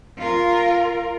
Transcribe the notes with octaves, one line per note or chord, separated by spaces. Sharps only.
F4 A#4